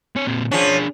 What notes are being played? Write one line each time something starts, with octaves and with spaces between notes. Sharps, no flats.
C4 C#5
A#2 C4
F3 C#4 D4 G#4